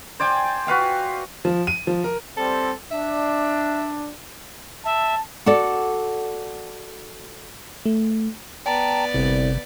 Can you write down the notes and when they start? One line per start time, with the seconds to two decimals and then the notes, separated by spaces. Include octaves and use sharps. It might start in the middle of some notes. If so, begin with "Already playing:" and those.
0.20 C5 D5 G5 G#5
0.67 F#4 B4 F5 G5
1.45 F3
1.67 D#7
1.87 F3
2.04 A#4
2.37 G3 C4 A4
2.91 D4 E5
4.85 E5 A5
5.46 F#4 A4 D5
7.85 A3
8.66 B3 D5 G5 A5 A#5
9.14 G1 C2 C3